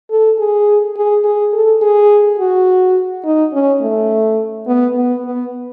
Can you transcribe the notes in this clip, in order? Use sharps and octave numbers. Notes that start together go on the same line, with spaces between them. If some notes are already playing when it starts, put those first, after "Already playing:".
A4
G#4
G#4
G#4
A4
G#4
F#4
D#4
C#4
A3
B3
B3
B3